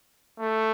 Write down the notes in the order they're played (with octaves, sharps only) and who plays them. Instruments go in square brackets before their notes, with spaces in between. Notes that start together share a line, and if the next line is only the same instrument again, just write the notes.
[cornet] A3